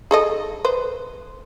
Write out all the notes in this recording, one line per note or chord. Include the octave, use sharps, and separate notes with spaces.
G#4 A4 D#5
B4 C5